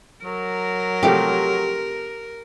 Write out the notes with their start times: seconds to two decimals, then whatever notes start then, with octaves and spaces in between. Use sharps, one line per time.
0.25 F#3 A#4
1.03 C3 F3 A3 G4